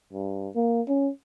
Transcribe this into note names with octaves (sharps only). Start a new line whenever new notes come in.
G2
A#3
C#4